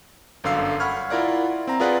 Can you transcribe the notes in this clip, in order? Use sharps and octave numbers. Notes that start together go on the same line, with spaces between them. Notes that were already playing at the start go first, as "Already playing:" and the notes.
G1 F#2 D3 F5 E6 C7
F#5 B5 C#6 F6 G#6
E4 F4 A#4 D5 F#5
C4 A#5
F4 G#4 A#4 B4 D5 F#5